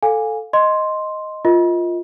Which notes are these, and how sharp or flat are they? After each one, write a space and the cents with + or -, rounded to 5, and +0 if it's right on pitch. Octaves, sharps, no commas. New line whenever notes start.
A4 +0 F5 +30 G#5 -15
D#5 +0 C6 +0
F4 +0 A#4 +0 D#5 +25